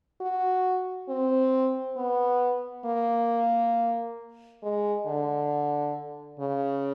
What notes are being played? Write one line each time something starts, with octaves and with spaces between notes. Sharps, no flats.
F#4
C4
B3
A#3
G#3
D3
C#3